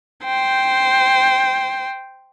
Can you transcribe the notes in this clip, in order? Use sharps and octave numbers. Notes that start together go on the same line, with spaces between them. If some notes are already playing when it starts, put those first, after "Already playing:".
C5 G5